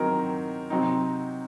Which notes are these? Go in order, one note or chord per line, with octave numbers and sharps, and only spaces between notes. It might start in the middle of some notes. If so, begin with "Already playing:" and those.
Already playing: D#3 F#3 C4 D#4 A#4
C3 F#3 C4 D#4